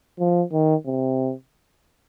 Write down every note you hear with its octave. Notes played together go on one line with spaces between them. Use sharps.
F3
D#3
C3